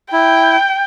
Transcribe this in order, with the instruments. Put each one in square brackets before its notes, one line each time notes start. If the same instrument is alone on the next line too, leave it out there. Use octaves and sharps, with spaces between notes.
[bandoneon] E4 [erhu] G5